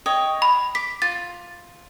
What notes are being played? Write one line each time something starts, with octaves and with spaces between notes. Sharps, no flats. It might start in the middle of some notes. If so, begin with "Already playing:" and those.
C#5 D#5 G5
B5
D6 B6
F4 A6